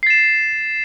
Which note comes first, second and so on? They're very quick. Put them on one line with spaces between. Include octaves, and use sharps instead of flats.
C7 A6 E7